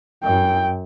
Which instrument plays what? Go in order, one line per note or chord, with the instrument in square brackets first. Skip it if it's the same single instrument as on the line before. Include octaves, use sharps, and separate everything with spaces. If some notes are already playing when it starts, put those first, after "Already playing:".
[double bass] F#2 [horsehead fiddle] G5